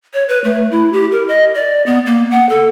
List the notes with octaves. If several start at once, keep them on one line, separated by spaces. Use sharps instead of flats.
C#5
B4
A3
E4
G4
A#4
D#5
D5
B3
A#3
F#5
A4